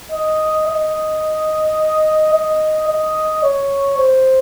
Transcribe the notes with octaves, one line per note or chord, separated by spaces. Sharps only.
D#5
D#5
D#5
D#5
C#5
C5